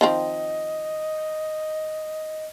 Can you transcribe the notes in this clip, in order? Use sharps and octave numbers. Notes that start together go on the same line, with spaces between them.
D#3 F3 C4 D#5